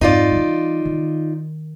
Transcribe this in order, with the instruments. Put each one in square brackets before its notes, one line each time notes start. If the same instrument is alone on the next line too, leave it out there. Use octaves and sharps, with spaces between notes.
[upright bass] F2 G#2 [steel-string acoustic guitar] D#4 F4 D5
[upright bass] E3 G3
D#3